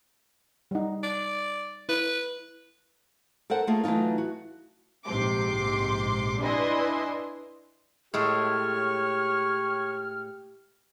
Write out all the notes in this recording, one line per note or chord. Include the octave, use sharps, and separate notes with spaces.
G3 D#4
D5
E4 B4
A4 A#4 C5 F#5
A3 A#3 F4 G#4 A#4
E3 F#3 A3 D#4 F4
F#4
A#1 G#2 C3 C6 D6
D4 E4 B4 D#5 G#5 C6
A2 G#3 A3 G4 C#5 C#6 F6